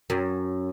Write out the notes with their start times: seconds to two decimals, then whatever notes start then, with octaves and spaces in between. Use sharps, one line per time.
0.10 F#2